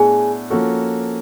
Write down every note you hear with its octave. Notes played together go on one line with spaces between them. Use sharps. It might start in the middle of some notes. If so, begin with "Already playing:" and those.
Already playing: A2 B3 D4 G#4 G#5
F3 A#3 C#4 F#4 A4